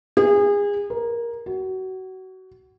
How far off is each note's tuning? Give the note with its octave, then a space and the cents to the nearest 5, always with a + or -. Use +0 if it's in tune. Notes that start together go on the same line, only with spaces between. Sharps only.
G#4 -30
A#4 +10
F#4 +25